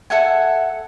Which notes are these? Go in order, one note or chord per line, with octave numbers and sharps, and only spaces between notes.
A4 E5 F#5 G#5